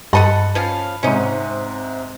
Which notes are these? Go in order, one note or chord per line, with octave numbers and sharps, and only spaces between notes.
G2 A4 D#5 F#5 A5 B5 C#7
F3 C#4 F5
G#2 C3 C#4 D#4